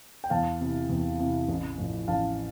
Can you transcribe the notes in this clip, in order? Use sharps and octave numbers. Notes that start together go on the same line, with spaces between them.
G5
E2 F5 A5
C3 E3
E2
C3 E3
A1
A2 F3
A1 F5 A5